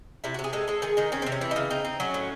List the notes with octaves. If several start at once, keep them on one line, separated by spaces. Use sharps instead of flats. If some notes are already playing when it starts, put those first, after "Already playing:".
C3 E4
F#4
C3
G#4
G#3 A4
G#3 A4
D#3 G#4
D#3 D#4
C4 C#4
C3 C4
C#4
E3 E4
C#3 D#4
C4 D#4
C4
F#3 C#4
A2